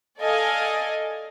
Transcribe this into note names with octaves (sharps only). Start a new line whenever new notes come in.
A4 D5 D#5 F5 G#5